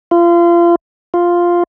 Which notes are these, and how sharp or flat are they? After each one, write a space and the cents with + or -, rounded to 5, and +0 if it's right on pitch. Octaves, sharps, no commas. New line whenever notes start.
F4 -30
F4 +0